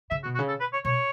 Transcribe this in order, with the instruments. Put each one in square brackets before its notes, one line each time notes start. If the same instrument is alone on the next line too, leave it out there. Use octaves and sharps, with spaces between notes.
[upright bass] C#3 [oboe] E5
[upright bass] B2 [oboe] F#4
[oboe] F#4
[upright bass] C#3
[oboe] A4
B4
C#5
[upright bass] B2 [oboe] C#5